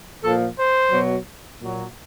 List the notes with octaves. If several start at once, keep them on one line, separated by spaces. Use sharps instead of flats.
A#2 F3 A4
C5
B2 F#3
A#2 F#3